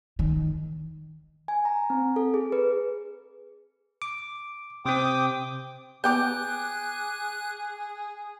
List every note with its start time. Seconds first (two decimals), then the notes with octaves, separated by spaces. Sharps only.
0.19 D#3
1.48 G#5
1.65 A#5
1.90 C4
2.16 A4
2.34 G#4
2.52 B4
4.02 D6
4.86 C3 C4 G5 D6 D#6
6.04 B3 G#4 G5 A#5 D6 F#6 G6